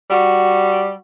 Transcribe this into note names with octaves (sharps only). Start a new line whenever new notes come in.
G3 F#4